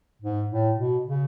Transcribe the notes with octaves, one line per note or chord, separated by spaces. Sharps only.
G#2
A2
B2
C#3